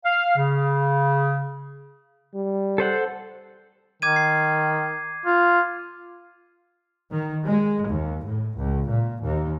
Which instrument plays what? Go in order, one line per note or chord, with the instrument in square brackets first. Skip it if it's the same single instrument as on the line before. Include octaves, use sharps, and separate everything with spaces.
[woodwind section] F5
C#3
[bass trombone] G3
[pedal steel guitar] A4 C5 F#5
[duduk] D#3 [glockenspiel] D6 G#6 D#7
[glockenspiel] C7
[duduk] F4
[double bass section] D#3
G#3
D#2
A2
C#2
A#2
D#2